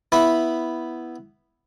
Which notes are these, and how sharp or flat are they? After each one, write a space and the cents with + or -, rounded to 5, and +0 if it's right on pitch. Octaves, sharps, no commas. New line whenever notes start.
B3 +0 E4 +0 B5 +0